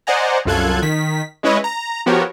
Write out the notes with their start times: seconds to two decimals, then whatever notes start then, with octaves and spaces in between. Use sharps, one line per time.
0.07 C5 D5 D#5 F#5 G#5 A#5
0.45 C2 F#2 F4 A4 F#6 G#6
0.82 D#3 B6
1.43 G#3 C#4 E4 B4 C#5 D#5
1.64 A#5
2.06 F3 B3 F#4 G4 A#4 C#5